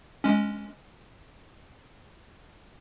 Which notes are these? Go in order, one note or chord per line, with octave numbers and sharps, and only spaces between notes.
G#3 C#4